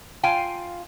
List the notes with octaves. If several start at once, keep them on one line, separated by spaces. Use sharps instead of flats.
F4 F5 G5 G#5